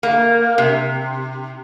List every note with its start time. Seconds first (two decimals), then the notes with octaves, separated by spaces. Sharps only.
0.03 A#3
0.58 C3